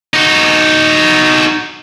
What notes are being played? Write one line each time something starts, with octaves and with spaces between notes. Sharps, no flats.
D#4 F#4